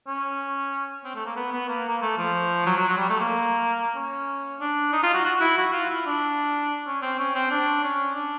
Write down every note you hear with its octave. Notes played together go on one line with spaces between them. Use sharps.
C#4
C4
A3
A#3
B3
B3
A#3
A#3
A3
F3
F#3
F#3
F#3
G3
A3
A#3
C#4
D4
D#4
F4
F#4
F#4
E4
F#4
F4
E4
D4
C#4
C4
C#4
C4
D4
C#4
D4